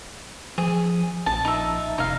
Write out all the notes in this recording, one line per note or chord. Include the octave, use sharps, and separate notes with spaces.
F3 G#4
A#1 A5
D#4 E5
F1 D#4 F5